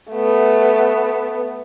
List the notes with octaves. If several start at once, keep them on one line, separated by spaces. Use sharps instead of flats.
A3 B3